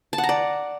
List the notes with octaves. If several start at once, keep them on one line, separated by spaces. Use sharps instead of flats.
A5
F#5
A#5
D5